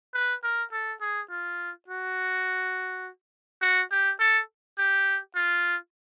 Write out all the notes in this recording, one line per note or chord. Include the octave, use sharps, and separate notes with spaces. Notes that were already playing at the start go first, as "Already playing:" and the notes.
B4
A#4
A4
G#4
F4
F#4
F#4
G4
A4
G4
F4